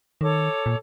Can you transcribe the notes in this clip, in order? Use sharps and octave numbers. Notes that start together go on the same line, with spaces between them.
D#3 A4 C#5 D6
A#2